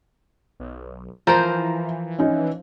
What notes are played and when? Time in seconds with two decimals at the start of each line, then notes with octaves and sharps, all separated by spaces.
0.60 B1
1.27 E3 F3 A#4 C5 A#5
2.19 C#4 D#4